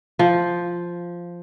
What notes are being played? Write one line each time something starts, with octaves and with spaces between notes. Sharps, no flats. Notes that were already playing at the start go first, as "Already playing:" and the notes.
F3